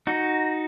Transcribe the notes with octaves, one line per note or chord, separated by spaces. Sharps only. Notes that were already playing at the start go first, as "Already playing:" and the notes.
D#4 F#4